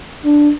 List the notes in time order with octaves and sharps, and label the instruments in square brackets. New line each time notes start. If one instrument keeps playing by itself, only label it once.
[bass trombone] D4